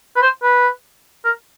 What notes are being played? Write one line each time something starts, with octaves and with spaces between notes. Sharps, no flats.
B4
C5
B4
A#4